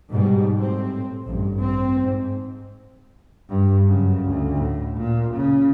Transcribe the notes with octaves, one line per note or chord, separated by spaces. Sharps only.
G#2 B2 G3
A2 C4
A1 G2
C4
G#2
G2
F#2 C#3
D2
A2
A#2
C#3